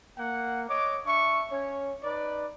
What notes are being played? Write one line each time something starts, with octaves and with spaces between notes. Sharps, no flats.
A#3 F#5
C#5 D#5 D6
D4 E5 C#6
C#4 C#5
D#4 B4 D5